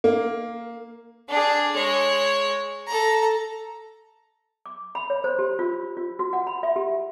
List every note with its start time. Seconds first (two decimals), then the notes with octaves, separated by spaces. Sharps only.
0.04 A#3
1.28 D4 G#4
1.75 G#3 C#5
2.87 A4 A#5
4.66 D6
4.95 B5
5.10 C#5
5.24 C5
5.39 G4
5.59 F4
5.97 F4
6.19 F#4
6.33 F#5
6.47 B5
6.63 E5
6.76 G4